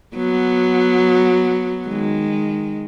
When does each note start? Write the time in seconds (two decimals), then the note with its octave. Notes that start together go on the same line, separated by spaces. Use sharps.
0.16 F#3 B3
1.88 D#3 G#3